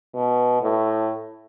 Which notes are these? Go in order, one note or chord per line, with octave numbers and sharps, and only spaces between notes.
B2
A2